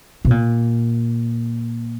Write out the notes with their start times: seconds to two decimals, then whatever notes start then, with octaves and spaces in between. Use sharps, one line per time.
0.25 B2
0.31 A#2